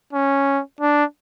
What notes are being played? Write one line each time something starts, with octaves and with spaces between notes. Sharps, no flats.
C#4
D4